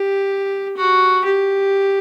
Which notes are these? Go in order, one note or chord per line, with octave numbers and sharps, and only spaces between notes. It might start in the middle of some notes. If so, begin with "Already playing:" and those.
Already playing: G4
F#4
G4